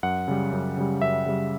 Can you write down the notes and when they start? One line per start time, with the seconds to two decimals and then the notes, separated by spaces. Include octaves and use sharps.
0.03 F#2 F#5
0.28 C#3 G3
0.52 F#2
0.77 C#3 G3
1.02 F#2 E5
1.26 C#3 G3